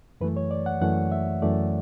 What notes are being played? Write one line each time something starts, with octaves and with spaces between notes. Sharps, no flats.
F#2 E3 A3 B4
C#5
D5
F#5
F#2 E3 A3 F#5
E5
F#2 E3 A3 D5